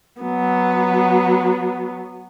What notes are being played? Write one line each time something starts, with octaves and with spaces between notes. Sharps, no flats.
F#3 B3